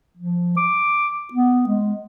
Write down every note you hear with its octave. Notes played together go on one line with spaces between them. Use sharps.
F3
D6
B3
G#3